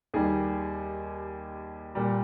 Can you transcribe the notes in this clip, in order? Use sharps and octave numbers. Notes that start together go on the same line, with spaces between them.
D#2 D#3 G3 G#4
A#2 G3